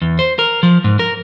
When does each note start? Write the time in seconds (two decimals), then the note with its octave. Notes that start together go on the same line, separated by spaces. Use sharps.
0.02 E2
0.19 C5
0.39 A#4
0.63 F3
0.84 G#2
0.99 A#4